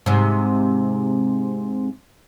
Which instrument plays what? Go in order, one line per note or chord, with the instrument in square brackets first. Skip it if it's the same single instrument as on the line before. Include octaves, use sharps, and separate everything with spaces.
[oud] G#2 C3